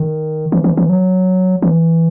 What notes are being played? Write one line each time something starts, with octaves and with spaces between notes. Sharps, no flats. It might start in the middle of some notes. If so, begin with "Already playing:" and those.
Already playing: D#3
E3
E3
E3
F#3
E3